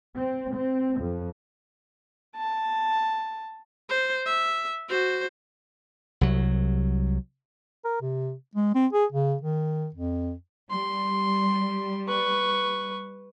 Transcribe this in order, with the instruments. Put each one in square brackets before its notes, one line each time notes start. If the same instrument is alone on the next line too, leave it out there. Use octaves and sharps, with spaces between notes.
[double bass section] C4
C4
F2
[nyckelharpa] A5
[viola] C5
E5
F#4 C5
[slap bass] C2 F#3
[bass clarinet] A#4
C3
G#3
C4
G#4
C#3
D#3
F2
[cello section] G3 [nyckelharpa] C6
[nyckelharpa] B4 C#6